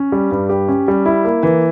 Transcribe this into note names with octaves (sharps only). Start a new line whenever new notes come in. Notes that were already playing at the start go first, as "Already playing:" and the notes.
Already playing: C#4
G3
G2
G4
C#4
G3
E4
A#3
E3